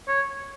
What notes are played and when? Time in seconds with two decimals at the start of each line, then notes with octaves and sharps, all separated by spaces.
0.08 C#5